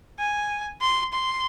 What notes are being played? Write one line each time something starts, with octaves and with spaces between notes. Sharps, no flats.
G#5
C6
C6